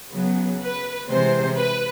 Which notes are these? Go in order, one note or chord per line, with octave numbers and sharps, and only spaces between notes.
C#3 F#3 B3
B4
C3 E3 G#3 C5
B4